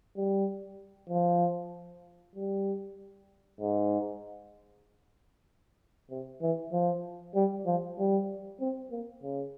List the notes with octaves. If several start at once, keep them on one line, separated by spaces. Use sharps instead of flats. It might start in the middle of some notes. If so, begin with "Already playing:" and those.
G3
F3
G3
G#2
C3
E3
F3
G3
F3
G3
C4
A#3
C#3